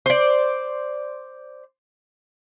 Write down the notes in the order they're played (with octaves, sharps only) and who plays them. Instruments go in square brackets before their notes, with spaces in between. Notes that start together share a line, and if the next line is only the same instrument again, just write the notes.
[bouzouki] C5 D5